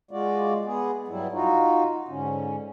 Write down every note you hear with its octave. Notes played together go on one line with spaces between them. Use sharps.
G#3 F4 F#4 D5
B3 G#4
G2 F#3 G3 E4
D#4 F4 F#4
G#2 D3 C#4